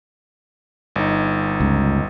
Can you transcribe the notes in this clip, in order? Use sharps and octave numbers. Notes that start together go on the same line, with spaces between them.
G1 D#4
C#2